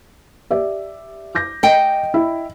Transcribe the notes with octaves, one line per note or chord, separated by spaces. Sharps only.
G4 D5 E5
D6 G6 A#6
D#5 G5
E4